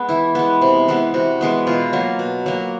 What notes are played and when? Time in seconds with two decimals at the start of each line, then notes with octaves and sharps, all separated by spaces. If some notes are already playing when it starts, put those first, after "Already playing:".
Already playing: G#3 B3
0.09 E3 E4
0.35 G#3 B3
0.62 C3
0.88 E3 G#3 B3
1.14 C3 F#4
1.41 E3 G#3 B3
1.67 B2 F4
1.93 F#3 A#3
2.19 B2
2.46 F#3 A#3